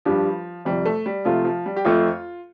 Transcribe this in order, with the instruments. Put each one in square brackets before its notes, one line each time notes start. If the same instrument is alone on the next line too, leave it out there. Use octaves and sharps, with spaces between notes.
[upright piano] G2 G3 D4 G4 [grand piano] F3
[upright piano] F2 C3 F3 [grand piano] G3
[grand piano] A3
G3
[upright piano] C3 A3 F4 [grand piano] F3
[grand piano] F3
G3
G4
[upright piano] F2 F3 A3 [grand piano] F4